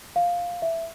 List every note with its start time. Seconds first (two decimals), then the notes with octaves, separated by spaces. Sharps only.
0.16 F5
0.62 E5